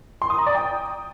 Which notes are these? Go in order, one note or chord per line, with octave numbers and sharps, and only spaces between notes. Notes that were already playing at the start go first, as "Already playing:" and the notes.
C6
D#6
A#5
D5
G5